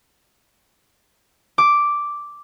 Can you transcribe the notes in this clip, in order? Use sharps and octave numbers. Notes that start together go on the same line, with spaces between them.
D6